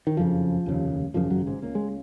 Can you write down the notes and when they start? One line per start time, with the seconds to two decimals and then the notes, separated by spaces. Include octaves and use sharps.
0.07 D#3
0.17 F#1 F2 C#3 F3
0.66 F1 D#2 C#3
1.14 G#1 F#2 C#3 F3
1.30 F#2 F#3
1.47 G#2 G#3
1.62 C#2 C#3 A#3
1.75 G#3